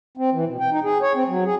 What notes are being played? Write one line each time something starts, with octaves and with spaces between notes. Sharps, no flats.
C4
E3
B2
G5
D#4
G#4
C#5
C4
F#3
G#4